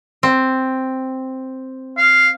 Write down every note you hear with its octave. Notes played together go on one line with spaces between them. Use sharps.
C4
F5